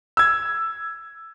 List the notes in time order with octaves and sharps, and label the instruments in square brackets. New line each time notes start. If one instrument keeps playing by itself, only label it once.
[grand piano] E6 G#6